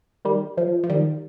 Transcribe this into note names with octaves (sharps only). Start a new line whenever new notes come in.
D#3 G3
F3
F3
D#3 G3